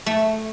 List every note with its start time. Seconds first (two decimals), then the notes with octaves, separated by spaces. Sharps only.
0.06 A3